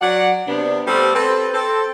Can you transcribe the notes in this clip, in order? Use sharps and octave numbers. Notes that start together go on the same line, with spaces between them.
F#3 D5 F#5
C3 B3 D4
G3 A3 B3 C4 G4 A4
C4 A4 B4
C4 A4